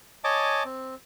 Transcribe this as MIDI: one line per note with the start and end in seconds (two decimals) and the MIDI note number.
0.24 0.63 73
0.24 0.63 75
0.24 0.63 80
0.24 0.63 81
0.24 0.63 86
0.65 0.95 60